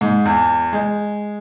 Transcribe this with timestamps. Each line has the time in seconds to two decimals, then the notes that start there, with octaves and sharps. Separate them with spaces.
0.01 G#2
0.25 E2
0.73 G#3